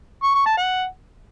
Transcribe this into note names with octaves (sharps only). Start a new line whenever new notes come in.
C#6
C#6
A5
F#5